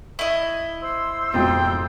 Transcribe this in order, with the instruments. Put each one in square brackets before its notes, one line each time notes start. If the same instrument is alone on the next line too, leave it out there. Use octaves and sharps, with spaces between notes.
[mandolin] E4 D#5
[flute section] C5 C6 E6
[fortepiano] F2 G#2 B2 [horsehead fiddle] G5